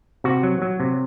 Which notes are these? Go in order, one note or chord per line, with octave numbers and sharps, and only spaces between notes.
C3 F#4
F#3
F#3
C3